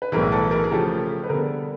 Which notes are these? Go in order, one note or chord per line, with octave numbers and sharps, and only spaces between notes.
B4
B1 A2 E3 G#4 A#4
A4 B4
G#4 A#4
G#4
C#3 F3 A3 G4 A4
B4
D3 G3 B3 G#4 A#4